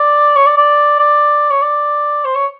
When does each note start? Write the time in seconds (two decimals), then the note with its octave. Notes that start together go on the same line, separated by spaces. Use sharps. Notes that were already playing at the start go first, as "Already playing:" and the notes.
Already playing: D5
0.36 C#5
0.46 D5
0.57 D5
0.99 D5
1.50 C#5
1.62 D5
2.25 C5
2.35 C#5